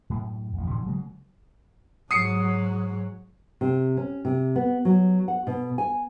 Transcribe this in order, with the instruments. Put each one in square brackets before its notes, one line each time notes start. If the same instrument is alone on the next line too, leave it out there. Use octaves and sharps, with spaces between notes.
[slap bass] F#2 A2
A1 F2
A2 D3 E3
C#3 F#3 G#3 A#3
[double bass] G#2 F#3 [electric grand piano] D#6 C7 C#7
[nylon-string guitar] C3
C#4
C3
B3
F#3
F#5
B2
G#5